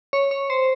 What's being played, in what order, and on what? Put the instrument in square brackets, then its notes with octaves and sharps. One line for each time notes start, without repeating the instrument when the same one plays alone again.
[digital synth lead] C#5
C#5
C5